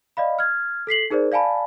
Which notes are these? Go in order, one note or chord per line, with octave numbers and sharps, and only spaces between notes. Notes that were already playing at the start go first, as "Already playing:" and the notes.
D5 D#5 F5 B5
F6 G#6
A4 B6 C7 F#7
D#4 G#4 A#4 C5 D5
D5 F5 G#5 A5 B5